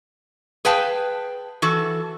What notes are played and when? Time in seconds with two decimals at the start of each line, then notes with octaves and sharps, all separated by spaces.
0.65 G#4 B4 F5 G5 A5
1.62 E3 F#4 A4